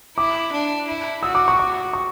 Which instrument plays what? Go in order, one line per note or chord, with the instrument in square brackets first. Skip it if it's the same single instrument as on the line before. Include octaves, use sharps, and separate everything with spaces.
[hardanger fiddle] E4 [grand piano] D6
[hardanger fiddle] D4
E4
[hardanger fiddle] F#4 [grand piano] E6
[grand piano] D6
C#6
D6
C#6